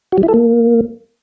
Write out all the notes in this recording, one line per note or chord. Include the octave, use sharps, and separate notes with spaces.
F#4
G3
E4
A4
A#3